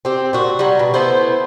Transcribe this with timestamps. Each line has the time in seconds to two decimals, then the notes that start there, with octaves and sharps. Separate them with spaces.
0.05 C4 G4
0.33 A#2 F#4
0.59 F#3 G3
0.79 B2
0.94 A3 B3 E4 C5